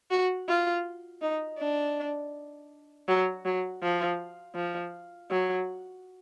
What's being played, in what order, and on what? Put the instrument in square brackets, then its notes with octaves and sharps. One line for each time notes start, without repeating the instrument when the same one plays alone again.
[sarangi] F#4
F4
D#4
D4
F#3
F#3
F3
F3
F#3